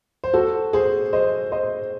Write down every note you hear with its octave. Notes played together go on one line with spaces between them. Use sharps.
C5
F#4 A4
G#4 C5
C5 D#5
C5 D#5